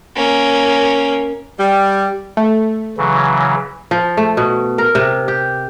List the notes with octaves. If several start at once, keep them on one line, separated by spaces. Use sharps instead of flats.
A#3 C#4
G3
A3
C#3 E3 F#3
F3
A3
B2
A#4
C3
G4